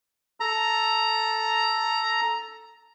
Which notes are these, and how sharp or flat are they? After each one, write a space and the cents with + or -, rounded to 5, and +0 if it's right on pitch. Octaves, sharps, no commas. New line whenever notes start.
A4 +0 A#5 +0